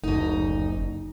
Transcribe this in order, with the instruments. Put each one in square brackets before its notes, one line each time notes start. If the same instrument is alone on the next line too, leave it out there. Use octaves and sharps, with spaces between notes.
[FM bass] F#1 [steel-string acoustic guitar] D2 D#4